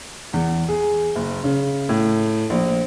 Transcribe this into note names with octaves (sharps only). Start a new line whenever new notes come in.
E2
G#4
F#1
C#3
A2
A#1